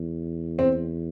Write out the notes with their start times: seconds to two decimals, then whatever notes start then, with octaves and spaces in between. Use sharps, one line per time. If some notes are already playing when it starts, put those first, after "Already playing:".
Already playing: E2
0.59 C4